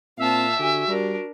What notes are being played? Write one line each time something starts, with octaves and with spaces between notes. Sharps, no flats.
A#2 C4 E5 F5 A5
D3 F#4 G4 G#5
G3 D4 A#4